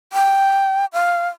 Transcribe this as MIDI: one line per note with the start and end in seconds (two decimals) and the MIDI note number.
0.13 0.86 79
0.93 1.28 77